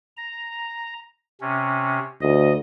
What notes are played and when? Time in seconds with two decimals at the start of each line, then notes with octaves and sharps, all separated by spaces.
0.17 A#5
1.41 C3 C#4
2.21 D2 D#5